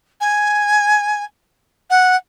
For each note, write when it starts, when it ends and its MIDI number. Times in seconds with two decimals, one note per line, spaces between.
0.21 1.24 80
1.90 2.16 78